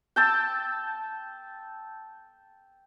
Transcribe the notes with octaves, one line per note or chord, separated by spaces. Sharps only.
G5 A5 E6